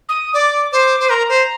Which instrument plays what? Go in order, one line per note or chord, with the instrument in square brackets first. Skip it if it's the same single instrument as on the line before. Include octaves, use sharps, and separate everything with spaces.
[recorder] D#6
[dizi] D5 [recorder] D6
[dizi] C5 [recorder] D6
[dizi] C5
[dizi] A#4 [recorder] C6
[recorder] A#5
[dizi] C5